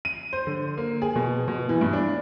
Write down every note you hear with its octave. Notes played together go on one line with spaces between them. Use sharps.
D#7
C5
D3
A#3
G#4
B2
B2
E3
G2
D4